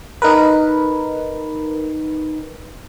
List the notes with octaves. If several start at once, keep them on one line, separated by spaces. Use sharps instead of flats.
D#4 A#4 B4